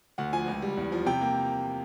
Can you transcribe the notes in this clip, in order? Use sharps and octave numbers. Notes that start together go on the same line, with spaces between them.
D2 F#5
F3 G#5
C#2
G3
E2
F3
C3 G5
A#3